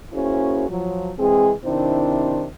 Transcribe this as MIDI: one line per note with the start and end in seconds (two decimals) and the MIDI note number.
0.13 0.68 58
0.13 0.68 61
0.13 0.68 64
0.13 0.68 66
0.13 0.68 68
0.13 0.68 72
0.70 1.10 53
0.70 1.10 54
1.19 1.52 52
1.19 1.52 56
1.19 1.52 60
1.19 1.52 68
1.65 2.45 48
1.65 2.45 51
1.65 2.45 60
1.65 2.45 62
1.65 2.45 64
1.65 2.45 72